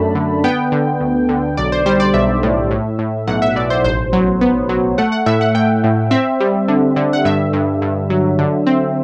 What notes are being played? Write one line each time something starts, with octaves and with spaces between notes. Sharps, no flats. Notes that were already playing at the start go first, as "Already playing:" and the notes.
Already playing: F#2 A3 D4 A5 B5
D3
B3 G5
D3
D2
D3
B1 D5
C5
G3 C5
D5
B1 E5
A2
A2
A2
B1 F#5
E5
B1 D5
C5
A1 C5
F#3
B3
F#3
A3 F#5
F#5
A2 E5
F#5
A2 G5
A2
C4 E5
G3
D3
D3
F#5
G2 E5
G2
G2
F#3
D3
C4